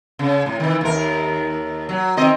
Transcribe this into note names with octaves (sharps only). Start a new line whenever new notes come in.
C#3
A2
D#3 E3
D#2 A#4
F#3
D#3 C4 D#5